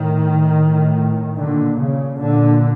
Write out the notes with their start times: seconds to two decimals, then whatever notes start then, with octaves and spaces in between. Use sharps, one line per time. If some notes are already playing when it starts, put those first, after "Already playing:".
Already playing: A2 D#3
0.58 A2
1.39 A#2 D3
1.80 C#3
2.20 A#2 D3